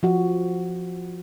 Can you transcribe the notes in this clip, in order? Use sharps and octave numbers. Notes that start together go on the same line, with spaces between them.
F3 F#4